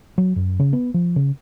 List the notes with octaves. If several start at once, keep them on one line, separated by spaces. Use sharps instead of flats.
F#3
F#2
C#3
B3
F3
C#3